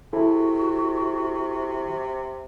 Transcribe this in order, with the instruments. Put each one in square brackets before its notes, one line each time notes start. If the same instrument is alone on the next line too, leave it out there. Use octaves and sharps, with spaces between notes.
[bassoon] C3 [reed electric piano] E4 G#4 A4 [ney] F#4